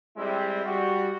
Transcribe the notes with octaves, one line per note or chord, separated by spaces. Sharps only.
G3 G#3 C4 E4
G3 F#4